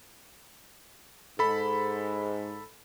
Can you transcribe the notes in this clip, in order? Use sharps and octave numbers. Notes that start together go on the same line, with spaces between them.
G#2 A4 B5